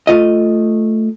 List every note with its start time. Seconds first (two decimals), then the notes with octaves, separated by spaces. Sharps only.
0.07 A3 F4 D#5